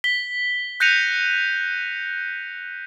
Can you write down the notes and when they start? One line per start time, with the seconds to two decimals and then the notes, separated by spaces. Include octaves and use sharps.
0.04 B6 G7
0.80 F#6 G6 A#6 C#7 D#7 F7